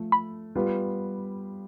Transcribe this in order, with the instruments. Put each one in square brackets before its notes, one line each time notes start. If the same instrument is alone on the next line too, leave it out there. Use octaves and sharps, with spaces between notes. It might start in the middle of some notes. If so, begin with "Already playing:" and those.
Already playing: [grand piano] F3 A3 A4
[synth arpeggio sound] B5
[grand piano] G3 B3 F4 B4